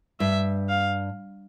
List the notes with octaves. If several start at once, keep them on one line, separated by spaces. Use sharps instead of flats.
G2 E5
F5